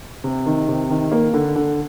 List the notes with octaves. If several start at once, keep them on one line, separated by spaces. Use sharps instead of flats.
C3
D#3
C3
D#3
A#3
D3
D3